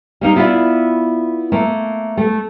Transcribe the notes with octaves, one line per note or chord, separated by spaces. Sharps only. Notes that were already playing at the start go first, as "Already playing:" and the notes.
G3 A#3 D#4
B3 E4 F4 C5 D5 E5
A3 A#3
A3